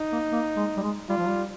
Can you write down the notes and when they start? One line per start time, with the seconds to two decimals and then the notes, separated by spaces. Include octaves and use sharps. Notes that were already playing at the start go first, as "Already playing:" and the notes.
Already playing: D#4
0.12 A#3
0.32 A#3
0.56 G#3
0.77 G3
0.83 G#3
1.08 G3 F4
1.18 F3
1.27 G3